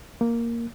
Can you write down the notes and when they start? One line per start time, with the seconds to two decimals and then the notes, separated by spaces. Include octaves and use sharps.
0.21 A#3